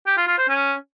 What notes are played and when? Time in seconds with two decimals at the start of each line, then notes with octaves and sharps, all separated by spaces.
0.07 G4
0.17 F4
0.28 F4
0.38 C5
0.49 C#4